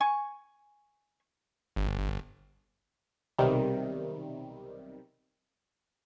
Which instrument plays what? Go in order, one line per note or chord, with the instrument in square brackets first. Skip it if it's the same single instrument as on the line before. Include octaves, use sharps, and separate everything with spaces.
[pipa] G#5 C#6
[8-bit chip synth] G1
[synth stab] B1 C3 D#3 G3